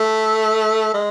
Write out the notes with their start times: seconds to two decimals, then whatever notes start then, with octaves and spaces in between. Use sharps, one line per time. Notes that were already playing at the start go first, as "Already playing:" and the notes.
Already playing: A3
0.94 G#3